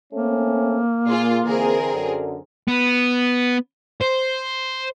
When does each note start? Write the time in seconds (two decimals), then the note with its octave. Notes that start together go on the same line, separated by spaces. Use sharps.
0.13 A3 A#3 C4 C#4
1.06 A#2 F4 G#4
1.45 D3 E3 C4 G#4 A#4
1.93 F#2 D3
2.68 B3
4.02 C5